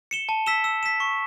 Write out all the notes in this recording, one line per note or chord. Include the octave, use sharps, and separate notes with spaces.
C#7 E7 G7
A5
E6 B6 E7 G7
E6
B6 E7
C#6